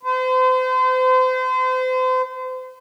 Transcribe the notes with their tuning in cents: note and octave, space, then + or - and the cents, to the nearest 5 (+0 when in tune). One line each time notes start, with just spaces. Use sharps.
C5 -35